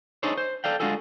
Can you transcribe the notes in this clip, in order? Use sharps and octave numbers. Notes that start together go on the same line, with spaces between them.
D4 D#4 G#4 A4 C5 C#5
C5
A4 D5 F5 G5
G#3 D4 F4 F#4 G#4 A4